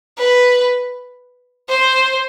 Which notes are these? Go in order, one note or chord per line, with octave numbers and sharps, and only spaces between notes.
B4
C5